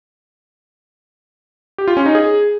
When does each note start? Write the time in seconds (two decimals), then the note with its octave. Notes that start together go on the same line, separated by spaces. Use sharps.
1.78 G4
1.88 F4
1.97 C#4
2.06 D#4
2.15 G#4